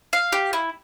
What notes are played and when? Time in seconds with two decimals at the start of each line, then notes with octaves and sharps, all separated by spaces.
0.13 F5
0.32 G4
0.53 E4